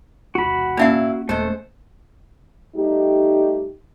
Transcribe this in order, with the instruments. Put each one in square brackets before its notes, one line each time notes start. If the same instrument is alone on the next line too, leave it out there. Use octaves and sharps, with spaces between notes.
[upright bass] E1 C2 [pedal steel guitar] F#4 B5
[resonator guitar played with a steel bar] A#2 E4 F5 [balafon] A#3 C#4 E5
[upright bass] D#1 [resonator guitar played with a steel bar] G#3 C5 [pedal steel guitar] A3 A4
[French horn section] G3 A3 D#4 G4